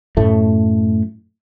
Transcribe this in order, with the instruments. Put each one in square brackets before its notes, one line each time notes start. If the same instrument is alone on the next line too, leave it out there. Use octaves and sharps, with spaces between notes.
[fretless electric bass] F#2 A2 A3